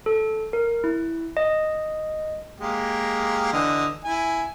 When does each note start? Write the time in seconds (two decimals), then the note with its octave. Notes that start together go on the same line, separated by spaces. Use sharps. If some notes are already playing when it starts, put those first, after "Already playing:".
0.06 A4
0.53 A#4
0.84 E4
1.37 D#5
2.60 G#3 A#3 G4
3.53 D3 E3 D#5
4.04 E4 G#5